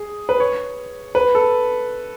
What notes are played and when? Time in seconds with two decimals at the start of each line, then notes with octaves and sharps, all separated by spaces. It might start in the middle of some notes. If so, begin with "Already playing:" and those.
Already playing: G#4
0.29 B4
0.40 C#5
1.15 B4
1.35 A4